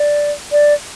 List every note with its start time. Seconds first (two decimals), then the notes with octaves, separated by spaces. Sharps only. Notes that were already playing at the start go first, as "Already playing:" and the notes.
Already playing: D5
0.52 D5